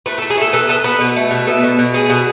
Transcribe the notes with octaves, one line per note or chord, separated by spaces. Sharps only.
A3 B4
A4
A3
G#4
A3 A4
B3 A4
B3 A4
B3 B4
B2
A3
B2
B3 A4
B2
B2
A3 G#4
B2